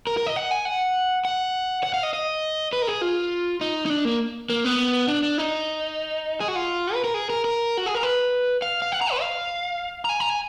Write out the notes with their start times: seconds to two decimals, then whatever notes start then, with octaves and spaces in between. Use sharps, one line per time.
0.07 A#4
0.17 A#4
0.27 D#5
0.36 F#5
0.51 G#5
0.65 F#5
1.25 F#5
1.83 F#5
1.94 F5
2.03 D#5
2.13 D#5
2.73 B4
2.82 A#4
2.87 G#4
3.01 F4
3.61 D#4
3.86 D#4
3.90 D4
4.05 A#3
4.50 A#3
4.65 B3
5.08 D4
5.23 D4
5.38 D#4
6.40 G#4
6.48 F#4
6.56 F4
6.94 B4
7.04 A#4
7.14 G#4
7.30 A#4
7.44 A#4
7.77 F#4
7.86 G#4
7.95 A#4
8.03 B4
8.62 F5
8.82 F5
8.92 F#5
9.01 A#5
9.11 B4
9.21 F5
10.05 A#5
10.09 G#5
10.20 A#5
10.30 G#5